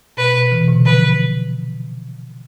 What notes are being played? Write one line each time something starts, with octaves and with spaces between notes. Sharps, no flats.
B2 B4
B2
C3 E3
B2 D3
D3 F3 B4